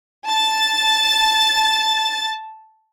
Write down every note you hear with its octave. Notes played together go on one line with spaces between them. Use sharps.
A5 A6